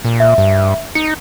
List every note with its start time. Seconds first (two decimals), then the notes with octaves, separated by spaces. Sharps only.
0.05 A#2
0.20 E5
0.38 G2
0.95 D#4 C#7